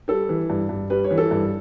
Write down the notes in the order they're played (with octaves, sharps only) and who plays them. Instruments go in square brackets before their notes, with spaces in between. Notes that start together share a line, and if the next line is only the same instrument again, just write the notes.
[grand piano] G3 A4
E3
G2
G2
G3 B4
C#5
E3 B4
A4
G2